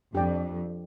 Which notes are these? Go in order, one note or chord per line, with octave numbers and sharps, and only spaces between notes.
F2 D4 G4 D5 G5